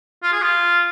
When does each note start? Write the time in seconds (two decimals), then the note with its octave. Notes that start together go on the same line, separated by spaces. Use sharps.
0.23 F4
0.32 G#4
0.42 F4